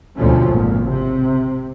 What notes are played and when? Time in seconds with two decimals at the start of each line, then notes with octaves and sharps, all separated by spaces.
0.17 D2 B2 D3 F3 A3 C#4
0.50 G#1 C#2 A#2
0.89 C3